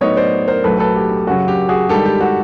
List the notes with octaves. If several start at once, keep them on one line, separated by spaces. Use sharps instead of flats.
A2 F#3 B3 D#4 C#5 D#5
C5 D5
A#4 C5
B1 A2 F#3 A4 B4
A4 B4
G4
G4
F#2 C#3 F#3 F#4
G4
F#4 G#4
G#2 D#3 G3 G4 A4
G4
F#4